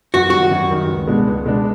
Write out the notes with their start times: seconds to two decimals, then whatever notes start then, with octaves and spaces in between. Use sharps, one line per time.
0.14 F#2 F#4
0.30 D#3 G3 F#4
0.51 F#2
0.71 D#3 G3
0.89 C#2
1.07 B2 G#3 B3 D4
1.27 C#2
1.45 B2 G#3 B3 D4